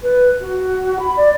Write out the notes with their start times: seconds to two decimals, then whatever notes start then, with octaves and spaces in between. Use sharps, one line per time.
0.03 B4
0.41 F#4
1.00 B5
1.17 D5